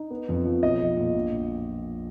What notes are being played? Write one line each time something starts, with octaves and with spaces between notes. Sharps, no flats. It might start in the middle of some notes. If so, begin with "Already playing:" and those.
Already playing: D#4
B3
F2
F3
B1 D#5
F3
A#2
A#1
A#1